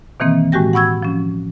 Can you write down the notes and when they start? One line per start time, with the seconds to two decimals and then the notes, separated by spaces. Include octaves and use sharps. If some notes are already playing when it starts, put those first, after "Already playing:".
0.20 B2 D#3 E3 A#3 C4
0.52 A2 G#3 F#4 G4 G5 A#6
0.73 F#5 B5 C#6 E6 G#6
1.03 F3 C#4